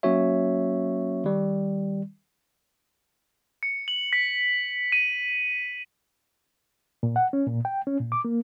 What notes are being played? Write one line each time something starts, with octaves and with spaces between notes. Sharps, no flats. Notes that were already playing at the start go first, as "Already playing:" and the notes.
F#3 A#3 C#4 F#4 C#5 E5
D#3 G3
C#7
F#7
B6
D#7
A#2
F#5
C#4
A#2
G5
C#4
A#2
D6
A#3